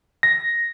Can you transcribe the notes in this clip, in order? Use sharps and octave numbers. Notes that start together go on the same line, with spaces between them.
A#6